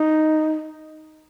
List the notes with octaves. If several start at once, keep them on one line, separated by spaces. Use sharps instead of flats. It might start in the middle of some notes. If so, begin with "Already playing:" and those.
Already playing: D#4